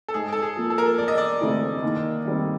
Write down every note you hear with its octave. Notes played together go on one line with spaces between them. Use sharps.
A4
G#2 G#4
A4
G#4
F3 A#3
A4
A#4
A4
E1 D5
D#5
D5
D2 C3 E3 G#3
D#2
D#3 G3 C4